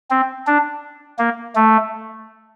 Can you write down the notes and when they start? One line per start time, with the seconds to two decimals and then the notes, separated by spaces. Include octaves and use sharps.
0.11 C4
0.47 D4
1.19 A#3
1.55 A3